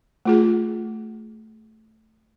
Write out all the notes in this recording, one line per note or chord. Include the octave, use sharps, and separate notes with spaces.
A3 F4 G#4